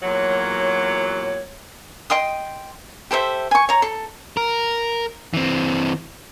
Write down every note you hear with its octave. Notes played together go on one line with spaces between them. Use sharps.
E2 A#2 F#3 C#5
D#5 G5 C6 D#6
G4 A4 C5 E5
G#5 C#6
C#5 A#5
A4
A#4
E3 C4